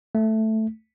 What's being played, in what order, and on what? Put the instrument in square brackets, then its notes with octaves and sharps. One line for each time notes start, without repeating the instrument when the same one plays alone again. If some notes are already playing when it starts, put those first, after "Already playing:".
[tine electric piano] A3